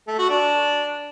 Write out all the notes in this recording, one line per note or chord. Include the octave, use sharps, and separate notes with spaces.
A3
F#4
D4